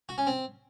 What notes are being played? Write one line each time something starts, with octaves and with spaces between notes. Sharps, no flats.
F#4
C#4
C4